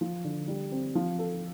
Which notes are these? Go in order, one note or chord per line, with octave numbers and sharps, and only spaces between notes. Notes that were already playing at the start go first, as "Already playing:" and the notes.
F3
D3
G3
C4
F3
A4